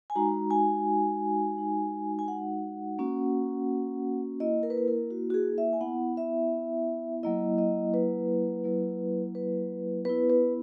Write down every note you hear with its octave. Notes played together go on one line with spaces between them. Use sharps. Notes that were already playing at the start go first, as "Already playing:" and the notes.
G#5
G#3 D#4 F#4 A#5
G#5
G#3 D#4 F#4
G#5
F#5
A#3 C#4 F#4
A#3 E4 D#5
A#4
B4
A#4
A#4
F#4
F#4
G#4
E5
G#5
B3 E4 F#5
E5
F#3 A#3 E4 D#5
D#5
B4
F#3 A#3 E4
B4
B3 E4 B4
B4